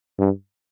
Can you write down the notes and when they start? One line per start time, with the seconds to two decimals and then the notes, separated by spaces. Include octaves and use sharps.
0.19 G2